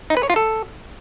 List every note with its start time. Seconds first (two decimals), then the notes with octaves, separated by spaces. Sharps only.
0.10 D#4
0.17 B4
0.23 C#5
0.30 F4
0.36 A4